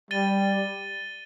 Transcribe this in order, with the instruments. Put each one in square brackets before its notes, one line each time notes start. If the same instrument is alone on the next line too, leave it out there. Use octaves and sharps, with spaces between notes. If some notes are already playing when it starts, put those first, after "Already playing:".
[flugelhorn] G3 [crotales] A6 D#7 G7